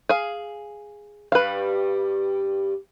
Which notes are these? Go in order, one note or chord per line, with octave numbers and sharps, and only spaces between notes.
G#4 F5
G2 G3 B4 F5